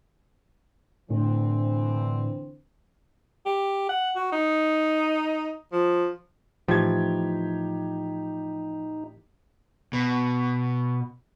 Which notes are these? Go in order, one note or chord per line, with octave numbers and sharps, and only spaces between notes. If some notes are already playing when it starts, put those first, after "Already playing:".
A2 D3 E3 C4
G4
F#5
F#4
D#4
F3
A2 E3 F3 D#4 G4 G#6
B2